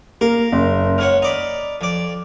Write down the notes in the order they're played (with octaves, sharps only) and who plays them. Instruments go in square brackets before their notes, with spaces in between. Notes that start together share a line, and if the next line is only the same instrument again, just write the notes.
[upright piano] A#3 [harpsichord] A#4 F5 A#5
[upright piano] F#1
[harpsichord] G#2 C#4 F#5 [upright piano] F6
[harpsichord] D#4 D5 B5
F2 D5